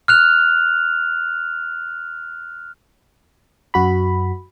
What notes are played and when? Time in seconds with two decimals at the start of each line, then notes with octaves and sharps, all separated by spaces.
0.08 F6 F#6 F7
3.74 F#2 F#4 B5